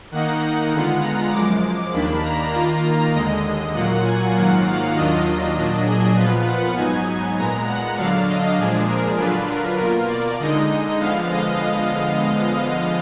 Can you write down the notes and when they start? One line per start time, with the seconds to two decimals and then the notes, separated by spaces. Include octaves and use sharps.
0.11 D#3 A#3 D#4 F#5
0.41 F#5
0.72 D3 G#3 B3 F4
1.02 A#5
1.32 F#2 F3 G#3 D6
1.93 D#2 D#3 A#3 D4 B5
2.23 A#5
2.53 D#3 A#3 F4
3.13 D#2 D3 G#3 D#5
3.74 A#2 F#3 A#3 F4 F#5
4.05 G#5
4.34 G#2 D#3 F#3 A#3 F4 F#5
4.65 F5
4.95 D#2 D#3 F#3 D4 F4 D#5
5.55 A#2 F#3 D4
5.86 G#4
6.16 A#2 F3 B3 F4 B4
6.46 F#5
6.76 G#2 F#3 B3 D#4 G#5
7.37 A#2 G#3 B3 A#5
7.67 F#5
7.97 D3 F#3 D4 F5
8.28 D#5
8.58 A#2 F3 G#3 D4 G#4
8.88 A#4
9.18 D3 F#3 D4 F4 B4
9.49 A#4
9.78 B2 A#3 F4 A#4
10.09 D5
10.39 D3 G#3 D#4 D#5
10.99 D3 F3 G#3 B3 F5
11.30 D#5